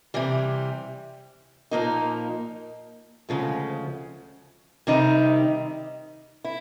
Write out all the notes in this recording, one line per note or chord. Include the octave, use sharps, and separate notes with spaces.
C3 E3 G3
A#2 F3 A#3 D#4
D2 C#3 F3 G#3
C3 D#3 G3 C4 D#4
E4